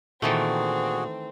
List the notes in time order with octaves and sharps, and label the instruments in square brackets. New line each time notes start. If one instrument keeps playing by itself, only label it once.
[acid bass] A#2 [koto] D#3 E3 A3 [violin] C4 [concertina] F#4 G#4